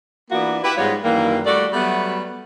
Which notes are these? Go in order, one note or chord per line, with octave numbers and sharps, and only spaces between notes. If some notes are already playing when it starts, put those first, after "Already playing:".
E3 A#3 B3 D4 F4 F#4
E4 G4 B4
G#2 G3 G#3 B3 F4 C#5
F#2 D#3 E3 G3 A#3
G3 A3 F#4 D5
F#3 G3 A3 B3